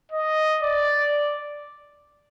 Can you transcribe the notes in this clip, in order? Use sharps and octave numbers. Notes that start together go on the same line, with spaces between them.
D#5
D5